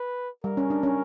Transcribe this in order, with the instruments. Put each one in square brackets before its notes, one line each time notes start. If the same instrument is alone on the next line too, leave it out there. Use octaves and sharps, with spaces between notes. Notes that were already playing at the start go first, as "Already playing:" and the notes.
Already playing: [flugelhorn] B4
[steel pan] G3 [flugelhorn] A#4
[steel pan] C#4
D4
C#4